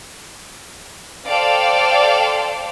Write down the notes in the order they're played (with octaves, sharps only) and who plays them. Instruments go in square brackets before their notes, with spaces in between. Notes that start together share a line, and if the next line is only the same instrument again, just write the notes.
[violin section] A4 C5 D5 F5 G5